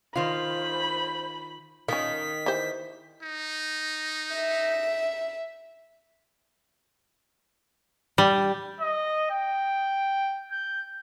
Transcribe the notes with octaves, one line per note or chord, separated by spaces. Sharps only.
D#3 F4 C5 B5
D#3 C#4 F4 B6
E3 G4 C5
D#4
E5
G3
D#5
G5
G6